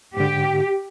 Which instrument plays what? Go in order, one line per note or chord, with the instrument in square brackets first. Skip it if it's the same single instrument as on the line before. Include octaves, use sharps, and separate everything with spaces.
[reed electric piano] G#2 D3 [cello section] G4